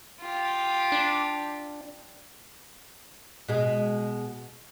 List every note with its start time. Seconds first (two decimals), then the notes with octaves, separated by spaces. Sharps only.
0.21 F4 G4
0.92 D4
3.48 B2 G#3